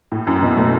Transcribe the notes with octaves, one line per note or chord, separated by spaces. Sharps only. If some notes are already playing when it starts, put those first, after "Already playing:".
A2
F#2
B2
A3